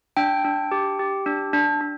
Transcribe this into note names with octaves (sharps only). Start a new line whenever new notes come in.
D4 G5
D4
G4
G4
D4
D4
D4